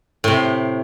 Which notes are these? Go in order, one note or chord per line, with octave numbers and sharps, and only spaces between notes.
A2 C3